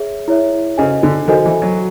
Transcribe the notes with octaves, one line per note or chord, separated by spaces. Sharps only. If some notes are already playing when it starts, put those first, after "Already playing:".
Already playing: G#4 C#5 E5
E4 G#4 C#5 E5
C#3 F#4 A4 C5 D#5 G#5
D3
D#3 F#4 A4 C5 D#5 G#5
E3
F#3